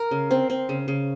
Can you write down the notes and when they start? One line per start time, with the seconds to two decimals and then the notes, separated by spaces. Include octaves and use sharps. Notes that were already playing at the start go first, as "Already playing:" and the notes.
Already playing: A#4
0.11 C#3
0.31 C4
0.50 C4
0.69 C#3
0.88 C#3